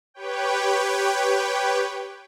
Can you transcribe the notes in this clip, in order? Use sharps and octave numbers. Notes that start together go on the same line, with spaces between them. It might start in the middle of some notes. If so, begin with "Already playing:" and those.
G4 B4 C#5 G5